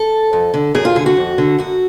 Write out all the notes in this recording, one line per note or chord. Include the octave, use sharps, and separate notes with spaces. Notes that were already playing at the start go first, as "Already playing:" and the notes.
Already playing: A4
F2
D3
F#2 G#4
F4
D3 G#4
F#4
F2
D3
F#2 F#4